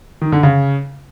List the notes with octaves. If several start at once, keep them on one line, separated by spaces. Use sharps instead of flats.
D#3
D3
C#3